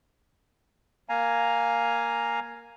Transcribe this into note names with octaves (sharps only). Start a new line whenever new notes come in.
A#3 F5 G#5 A#5